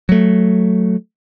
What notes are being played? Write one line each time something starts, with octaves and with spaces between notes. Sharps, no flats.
F#3 A3